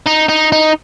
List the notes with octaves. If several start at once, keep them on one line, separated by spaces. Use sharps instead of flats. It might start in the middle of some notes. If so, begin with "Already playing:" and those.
D#4
D#4
D#4